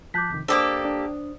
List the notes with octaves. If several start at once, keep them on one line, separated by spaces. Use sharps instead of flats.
F3 A5 D6 F#6 G6 B6
F2 C3 D#3
A#3 D4 G4 A4 C5 D5 D#6
D4